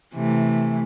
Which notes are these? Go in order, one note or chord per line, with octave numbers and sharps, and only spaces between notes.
C3 E3 A3